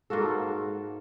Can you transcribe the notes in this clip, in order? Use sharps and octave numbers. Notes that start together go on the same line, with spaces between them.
G#2 A#3 F#4 A4